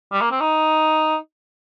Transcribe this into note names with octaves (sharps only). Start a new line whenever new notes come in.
G3
A#3
C4
D#4